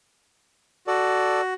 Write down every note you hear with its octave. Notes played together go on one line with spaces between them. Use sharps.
F#4 A4 D5